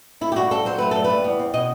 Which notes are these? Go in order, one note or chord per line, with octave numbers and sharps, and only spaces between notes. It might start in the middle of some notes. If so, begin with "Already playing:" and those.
A3 E4
G4
G2 F#4
C4 A4
F#3 C5
A3 B4
G2 A4
B4
G3
E2
C4
B2 D#5